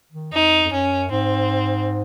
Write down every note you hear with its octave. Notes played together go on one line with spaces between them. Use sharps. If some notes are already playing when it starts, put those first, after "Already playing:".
D#3
F2 D#4
F2
F#2 C#4
G#2 C4